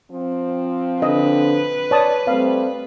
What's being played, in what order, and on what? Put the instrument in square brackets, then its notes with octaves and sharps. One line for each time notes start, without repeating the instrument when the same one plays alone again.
[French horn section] F3 C4
[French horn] D3 [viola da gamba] B4 [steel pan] D#5
[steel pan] C#5 A5 D#6 [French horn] D5
[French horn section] G3 A3 [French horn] C4 [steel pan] F5